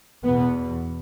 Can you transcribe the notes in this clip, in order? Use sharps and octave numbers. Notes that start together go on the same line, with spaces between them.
E2 B2 B3